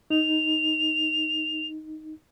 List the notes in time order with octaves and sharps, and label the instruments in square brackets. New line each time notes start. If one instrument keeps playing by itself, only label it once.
[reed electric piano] D#4 [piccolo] F7